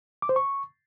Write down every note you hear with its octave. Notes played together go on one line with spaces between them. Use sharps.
D6
C5
C#6